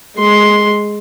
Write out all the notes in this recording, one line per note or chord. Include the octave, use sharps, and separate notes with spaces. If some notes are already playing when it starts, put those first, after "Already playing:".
G#3 C6